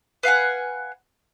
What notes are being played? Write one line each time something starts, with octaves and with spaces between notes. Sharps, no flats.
B4 F5 F#5 G#5